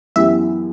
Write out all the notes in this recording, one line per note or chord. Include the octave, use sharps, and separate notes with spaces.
F#2 E3 B3 E4 G4 E5